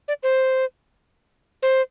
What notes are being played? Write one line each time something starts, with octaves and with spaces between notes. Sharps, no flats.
D5
C5
C5